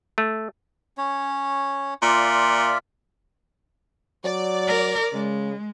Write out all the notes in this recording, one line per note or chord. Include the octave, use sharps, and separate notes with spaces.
A3
C#4 C#5
A#2 F4 D5 E5
F#3 D5
A#4
C#3 G#3